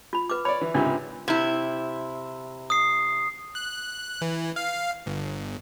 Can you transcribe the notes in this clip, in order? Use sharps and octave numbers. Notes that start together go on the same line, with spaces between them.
F4 B5
B4 D6
C#5 D5 B5
E3
C#2 G#2 C3 D4 F4 A#4
C3 E4
D#6 C7
F#6
E3
F5
G1